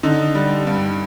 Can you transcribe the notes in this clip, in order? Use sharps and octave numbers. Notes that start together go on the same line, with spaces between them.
D3 D#4
G3
G2